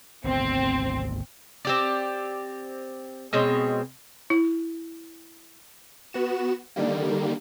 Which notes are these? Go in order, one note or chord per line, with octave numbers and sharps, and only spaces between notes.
G#1 D2 B3 C4
C4 G4 D5
B2 G#3 C4 C#5
E4
B3 F#4 E7
D3 D#3 G3 A#3